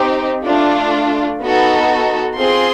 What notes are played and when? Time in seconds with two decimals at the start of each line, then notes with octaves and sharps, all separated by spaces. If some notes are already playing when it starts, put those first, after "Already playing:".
Already playing: C4 D#4 G4
0.45 A3 D4 F4
1.41 B3 D#4 F#4 A4
2.37 C4 F4 G#4 C6